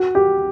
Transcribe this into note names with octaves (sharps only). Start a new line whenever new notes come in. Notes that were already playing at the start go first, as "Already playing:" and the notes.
Already playing: F#4
G4